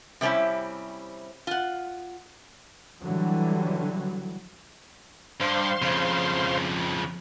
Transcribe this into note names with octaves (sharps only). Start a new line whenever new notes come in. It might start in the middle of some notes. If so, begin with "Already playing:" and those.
C3 G3 C4 C#4 E4
F4 F#5
D3 E3 F#3 G3
G2 C5 F5 C6
F2 C#3